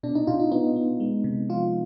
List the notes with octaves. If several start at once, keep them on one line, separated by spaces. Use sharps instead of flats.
B2 D4
D#4
B2 F4
D#4
B3 D#4
B3
G#3
C3
F3 F4